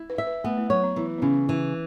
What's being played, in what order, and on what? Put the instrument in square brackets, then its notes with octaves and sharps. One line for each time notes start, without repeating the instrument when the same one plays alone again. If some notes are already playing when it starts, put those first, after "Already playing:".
Already playing: [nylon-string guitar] E4
[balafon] B4
[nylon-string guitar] E5
[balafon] B4
[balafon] A3 [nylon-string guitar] B3
[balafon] A3
[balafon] F#3 [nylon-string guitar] C#5
[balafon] B3
[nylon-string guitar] E3 [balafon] B3
[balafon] B3
[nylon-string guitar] C#3 [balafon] C#4
[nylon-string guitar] E3 [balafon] E4